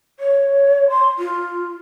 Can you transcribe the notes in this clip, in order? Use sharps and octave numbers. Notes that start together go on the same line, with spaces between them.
C#5
C6
F4